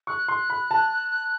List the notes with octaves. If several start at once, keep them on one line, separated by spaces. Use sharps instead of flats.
C#6 F#6
C6
B5
A5